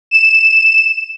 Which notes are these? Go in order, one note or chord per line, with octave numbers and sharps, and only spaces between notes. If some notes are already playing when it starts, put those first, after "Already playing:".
E7